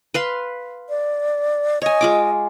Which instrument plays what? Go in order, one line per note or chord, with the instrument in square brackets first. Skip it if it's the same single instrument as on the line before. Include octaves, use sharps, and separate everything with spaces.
[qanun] B4 F5 C6
[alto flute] D5
[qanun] C#5 G#5 [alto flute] D#5
[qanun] G#3 F4 D6